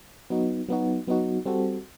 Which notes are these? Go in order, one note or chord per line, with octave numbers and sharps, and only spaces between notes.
F#3 B3 D#4 F#4
F#3 B3 D#4 F#4
F#3 B3 D#4 F#4
G3 C4 F#4 A4